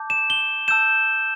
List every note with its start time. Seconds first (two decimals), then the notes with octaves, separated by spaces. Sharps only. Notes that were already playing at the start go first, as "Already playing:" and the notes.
Already playing: A5 D6 G6
0.10 E7
0.30 G7
0.68 A5 E6 G6 E7